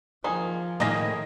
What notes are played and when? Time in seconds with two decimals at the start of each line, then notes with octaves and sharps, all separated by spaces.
0.24 D#3 F3 A#3 G#4
0.80 A2 D#3 G#3 A#3 C#4 D#5 A#6